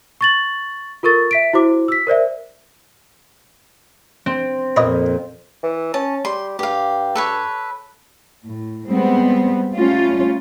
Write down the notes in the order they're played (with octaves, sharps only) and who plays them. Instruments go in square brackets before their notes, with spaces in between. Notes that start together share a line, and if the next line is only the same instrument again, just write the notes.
[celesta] C#6 A6 F#7
F4 A4 A#4 C#6 A6
E5 B6 D7
E4 F#4 C5 D6
E6 B6
A#4 C5 D5 E5
[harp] C4
[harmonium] F2 [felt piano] A#2 A#3 [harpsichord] B4 C#5 D#5
[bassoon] E3
[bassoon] C#4 [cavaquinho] A5
[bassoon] G3 [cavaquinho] C6
[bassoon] G2 [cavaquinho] G4 F5
[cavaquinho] A4 B4 C#5
[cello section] A2
G3 G#3 B3 C4
G3 A3 C#4 F4